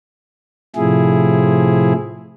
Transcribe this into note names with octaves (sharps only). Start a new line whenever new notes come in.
A2 C3 F3 E4 G#4